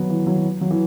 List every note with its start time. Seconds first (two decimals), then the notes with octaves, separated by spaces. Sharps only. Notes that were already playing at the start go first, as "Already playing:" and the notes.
Already playing: F#3 B3
0.10 E3
0.27 F#3
0.61 F#3
0.71 E3